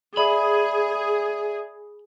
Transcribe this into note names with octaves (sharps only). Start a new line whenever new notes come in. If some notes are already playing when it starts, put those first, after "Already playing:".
G#4 D5 E5 B5 D#6